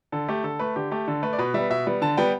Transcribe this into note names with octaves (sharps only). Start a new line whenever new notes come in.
D3 A4
A3 G4
D3 A4
A3 B4
D3 G4
A3 G4
D3 A4
A3 B4
D5
B2 B4
G3 B3 E5
B2 E5
G3 B3
D3 A5
G3 B3 G5